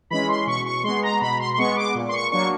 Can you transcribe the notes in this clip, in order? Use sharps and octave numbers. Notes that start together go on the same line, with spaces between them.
E3 G#3 C#4 B5
C6
B2 C#6
C#6
G#3 B3 C6
A#5
B2 B5
C6
C6
G#3 B3 C#6
D6
A#2
C6
C#6
F#3 A#3 D4 C#6